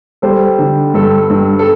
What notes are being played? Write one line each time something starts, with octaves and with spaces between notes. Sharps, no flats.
G3 A4 C5
D3
G2 A4
G2
A4